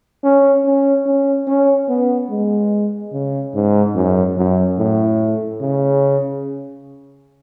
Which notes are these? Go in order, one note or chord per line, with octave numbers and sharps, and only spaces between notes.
C#4
C#4
C#4
C#4
B3
G#3
C#3
G#2
F#2
F#2
A2
C#3